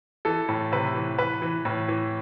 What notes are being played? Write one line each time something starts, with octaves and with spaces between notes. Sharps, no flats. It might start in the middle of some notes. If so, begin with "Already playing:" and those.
E3 A4
A2
C3 B4
E3
E3 B4
E3
A2
E3